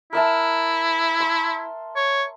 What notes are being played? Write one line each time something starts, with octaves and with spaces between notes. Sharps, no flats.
E4 A#4 E5 A5
C6
C#5